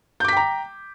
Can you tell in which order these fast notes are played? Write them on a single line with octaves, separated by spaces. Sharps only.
G6 D6 B6 G5 A#5